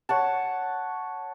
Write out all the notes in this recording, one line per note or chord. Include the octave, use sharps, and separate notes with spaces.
C#5 F#5 A5